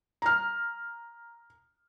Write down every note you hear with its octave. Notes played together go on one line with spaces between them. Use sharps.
A#5 F6